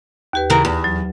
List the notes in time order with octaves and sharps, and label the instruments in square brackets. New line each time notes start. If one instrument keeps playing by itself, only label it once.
[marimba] D#2 G4 B4
[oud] C#3 E3 A#4
E2
[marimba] F#3